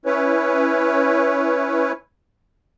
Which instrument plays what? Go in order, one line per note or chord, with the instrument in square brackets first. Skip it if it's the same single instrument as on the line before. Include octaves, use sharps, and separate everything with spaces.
[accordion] C#4 E4 B4 C#5